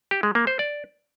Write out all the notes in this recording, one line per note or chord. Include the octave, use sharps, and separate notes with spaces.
G4
G#3
A#3
C5
D5